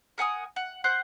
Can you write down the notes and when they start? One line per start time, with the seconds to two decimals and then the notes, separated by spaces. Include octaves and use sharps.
0.18 A#4 F#5 G#5 D#6
0.56 F#5
0.84 C5 F#5 F#6